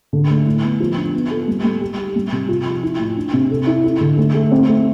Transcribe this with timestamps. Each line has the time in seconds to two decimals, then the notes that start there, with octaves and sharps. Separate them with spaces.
0.13 D3
0.30 A3
0.46 A2
0.64 B3
0.80 F3
0.97 D4
1.15 B3
1.31 A4
1.48 G3
1.64 G3
1.81 G4
1.98 G4
2.16 G3
2.32 C3
2.48 F4
2.65 F3
2.83 E4
2.99 A2
3.17 D4
3.33 C3
3.51 A4
3.67 E4
3.84 E4
4.01 D3
4.18 A3
4.34 A3
4.52 C4
4.68 A3